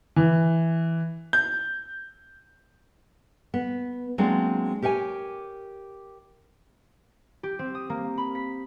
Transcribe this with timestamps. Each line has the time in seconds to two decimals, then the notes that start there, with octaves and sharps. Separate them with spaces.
0.16 E3
1.33 G6
3.54 B3
4.18 F#3 G#3 A#3 C4 D4
4.82 G4 A#4 C#5 F#5 G#5
7.43 G4
7.59 C4
7.75 D#6
7.90 A#3
8.18 B5
8.35 B6